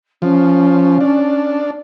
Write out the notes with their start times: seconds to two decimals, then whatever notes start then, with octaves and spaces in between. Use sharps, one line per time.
0.22 F3 C#4
1.01 D4